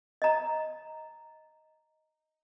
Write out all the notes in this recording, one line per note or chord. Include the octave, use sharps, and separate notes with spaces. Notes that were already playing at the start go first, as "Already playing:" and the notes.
D#5 A#5